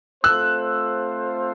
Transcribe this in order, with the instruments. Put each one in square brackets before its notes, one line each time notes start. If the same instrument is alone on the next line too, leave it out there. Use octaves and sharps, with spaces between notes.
[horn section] A3 C4 F4 A4 C5 [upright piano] E6 F#6